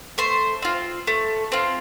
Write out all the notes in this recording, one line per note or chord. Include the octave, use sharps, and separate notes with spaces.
A3 C5
C4 F4
A3
C4 F4